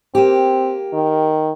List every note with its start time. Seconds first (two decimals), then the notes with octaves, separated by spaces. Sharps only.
0.15 A#3 C4 G4
0.93 D#3